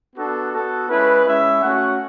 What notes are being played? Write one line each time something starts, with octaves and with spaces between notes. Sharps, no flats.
B3 D4 F#4 A4
B3 F#4 A4
G#3 C#4 E4 B4
G#3 C#4 E4 E5
A3 C#4 F#4 F#5